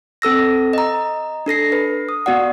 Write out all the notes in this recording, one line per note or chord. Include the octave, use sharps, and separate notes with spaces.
C4 A4 E6 A#6
D#5 A#5
D4 A4 A#6 C7
B4
D#6
B3 F#4 D5 F#5